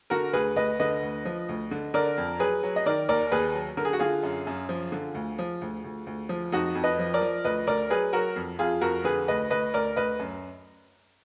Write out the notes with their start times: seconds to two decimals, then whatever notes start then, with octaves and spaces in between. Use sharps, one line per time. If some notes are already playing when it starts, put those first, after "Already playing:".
0.10 D3 F#4 A#4
0.33 D2 G#4 B4
0.56 D2 B4 D#5
0.80 D3 B4 D#5
1.02 D2
1.25 F3
1.49 D2
1.71 D3
1.94 D3 A#4 D5
2.18 F2
2.39 F#3 G#4 B4
2.63 F#3
2.76 D#5
2.86 D#3 A#4 D5
3.08 D#2 A#4 D5
3.32 D#2 G#4 B4
3.54 F#3
3.77 D3 A#4
3.85 G#4
3.93 F#4
3.99 D3 F4 G#4
4.23 F#2
4.47 F#2
4.69 F3
4.92 D3
5.15 D2
5.39 F3
5.61 D2
5.84 D2
6.07 D2
6.29 F3
6.52 F2 D#4 F#4
6.75 F2
6.84 B4 D#5
6.99 F3
7.14 A#4 D5
7.21 F3
7.45 D2 B4 D#5
7.67 D2 A#4 D5
7.90 F#3 G#4 B4
8.13 F#3 F#4 A#4
8.36 F2
8.59 F2 F4 G#4
8.81 F2 F#4 A#4
9.04 D3 G#4 B4
9.28 D2 B4 D#5
9.50 D2 B4 D#5
9.74 D2 A#4 D5
9.96 D2 B4 D#5
10.19 F#2